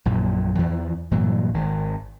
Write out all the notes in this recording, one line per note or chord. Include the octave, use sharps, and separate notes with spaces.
A#1 F#2 A#2
E2 E3 F3
G2 A#2 E3 F#3
G#1 D#3